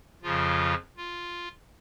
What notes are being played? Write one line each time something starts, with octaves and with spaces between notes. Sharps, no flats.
F2 C#3 F3 F4
F4